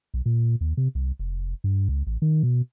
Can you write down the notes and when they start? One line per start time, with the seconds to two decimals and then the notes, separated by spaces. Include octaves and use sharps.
0.14 B1
0.26 A#2
0.61 D#2
0.77 C3
0.95 C2
1.19 F1
1.64 G2
1.89 C#2
2.07 A1
2.22 D#3
2.43 B2